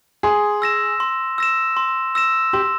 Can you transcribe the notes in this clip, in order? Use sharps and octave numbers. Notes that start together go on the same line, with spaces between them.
G#4 C6
E6 A#6 E7
C6
E6 A#6 E7
C6
E6 A#6 E7
G4 C6